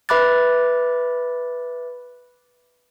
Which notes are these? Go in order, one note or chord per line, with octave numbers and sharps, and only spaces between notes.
B4 E5 B5 D6 F#6 A6